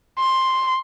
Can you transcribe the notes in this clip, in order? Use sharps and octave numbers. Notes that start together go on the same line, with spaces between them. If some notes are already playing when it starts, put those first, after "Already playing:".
C6